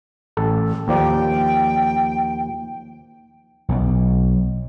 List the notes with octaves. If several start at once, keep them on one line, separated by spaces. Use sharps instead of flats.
A1 A4
D#2 F3 D5 G5
B1